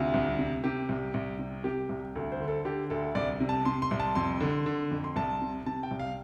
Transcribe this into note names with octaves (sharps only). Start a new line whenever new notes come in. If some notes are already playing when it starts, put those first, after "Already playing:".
Already playing: D2 C3 F4
C2
C3
C3 G4
C2
C2
C3
C3 G4
C2
D2 A4
C5
D3
A4
D3 G4
D2 A4
C2 D5
C3
A5
C3 C6
C6
C2
A5
F2 C6
D3
D3
F2
C6
C2 A5
C3
C3 A5
G5
C2
F5